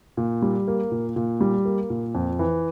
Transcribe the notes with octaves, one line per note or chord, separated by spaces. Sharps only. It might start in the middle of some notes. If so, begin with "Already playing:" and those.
A#2
G3
A#3
A#2
A#2
G3
A#3
A#2
F2
E3